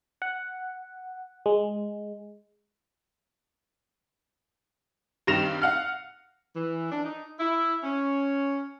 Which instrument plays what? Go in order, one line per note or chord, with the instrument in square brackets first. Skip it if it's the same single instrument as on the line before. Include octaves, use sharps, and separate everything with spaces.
[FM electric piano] F#5
G#3
[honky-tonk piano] G2 C3 D#3 A#6 E7 F7
F5 F#5 F6
[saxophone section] E3
D4
D#4
E4
C#4